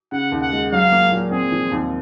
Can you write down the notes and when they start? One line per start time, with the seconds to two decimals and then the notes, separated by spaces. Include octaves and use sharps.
0.12 C#3 F#5
0.32 D#2
0.42 F#5
0.52 G#3
0.72 F#3 F5
0.92 A#3
1.12 A#2
1.31 C4 G#4
1.52 F3
1.72 D#2